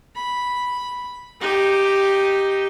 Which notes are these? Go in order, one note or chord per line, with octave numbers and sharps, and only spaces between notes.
B5
D#4 G4